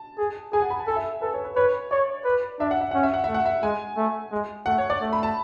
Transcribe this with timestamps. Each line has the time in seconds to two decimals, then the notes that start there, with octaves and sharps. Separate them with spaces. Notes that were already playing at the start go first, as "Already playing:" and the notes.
Already playing: A5
0.18 G#4
0.53 G#4 G#5
0.62 F#5
0.70 B5
0.79 A5
0.87 A4 G#5
0.96 E5
1.21 A4 B4
1.34 C#5
1.44 B4
1.56 B4 C#5
1.91 C#5 D5
2.25 B4
2.60 D4 E5
2.71 F#5
2.81 E5
2.91 C#4 F#5
3.03 E5
3.14 F#5
3.24 A3 E5
3.34 F#5
3.46 E5
3.63 G#3 G#5
3.97 A3
4.31 G#3
4.66 A3 F#5
4.78 C#5
4.90 D5
5.01 A3
5.13 B5
5.23 A5